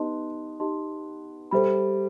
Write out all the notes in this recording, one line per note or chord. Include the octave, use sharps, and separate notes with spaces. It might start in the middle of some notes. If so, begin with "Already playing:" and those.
Already playing: B3 D#4 G4 D#5 A5 C6
D#4 G4 D#5 A5 C6
G3 A4 C5 E5 B5